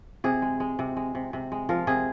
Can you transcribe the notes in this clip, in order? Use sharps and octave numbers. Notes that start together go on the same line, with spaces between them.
C3 G#4
G#3
G#3
C3
G#3
C3
C3
G#3
F3 A#4
C3 G#4